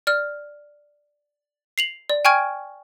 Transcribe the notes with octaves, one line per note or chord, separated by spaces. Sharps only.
D5 F6
C7 F7 F#7
D5
G5 G#5 C#6 F6 G#6 D7